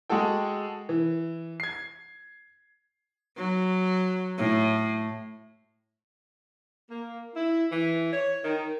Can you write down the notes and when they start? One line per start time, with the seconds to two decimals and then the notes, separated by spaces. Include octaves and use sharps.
0.10 G#3 F#4 G#4 A4 G5
0.89 E3
1.60 G#6 C7
3.37 F#3
4.38 A2
6.90 A#3
7.35 E4
7.72 E3
8.12 C#5
8.44 D#3